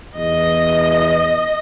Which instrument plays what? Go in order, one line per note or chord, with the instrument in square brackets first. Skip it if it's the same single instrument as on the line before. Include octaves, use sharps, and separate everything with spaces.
[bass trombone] E2 [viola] D#5